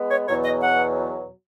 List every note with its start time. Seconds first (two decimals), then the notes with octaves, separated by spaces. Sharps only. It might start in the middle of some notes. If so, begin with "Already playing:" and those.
Already playing: G#3 B3
0.10 C#5
0.28 E2 B2 F#3 C#5
0.44 D#5
0.61 F#5